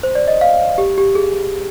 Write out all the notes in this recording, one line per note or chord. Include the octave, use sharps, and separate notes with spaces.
C5
D5
D#5
F5
G4
G4
G#4